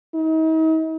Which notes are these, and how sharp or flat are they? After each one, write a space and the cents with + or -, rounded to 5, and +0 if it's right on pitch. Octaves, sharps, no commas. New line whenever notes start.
D#4 +40